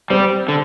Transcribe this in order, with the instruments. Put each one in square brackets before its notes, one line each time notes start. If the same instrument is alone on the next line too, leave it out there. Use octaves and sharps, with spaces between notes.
[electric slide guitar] G3 [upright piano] C4
[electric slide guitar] D3